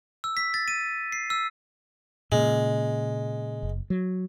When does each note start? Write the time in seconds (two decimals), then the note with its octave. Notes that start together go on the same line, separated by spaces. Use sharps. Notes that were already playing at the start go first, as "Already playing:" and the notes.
0.24 E6
0.37 B6
0.54 A6
0.68 D#7
1.12 C7
1.30 E6
2.32 A#2 C#3 G#3
3.63 F#1
3.90 F#3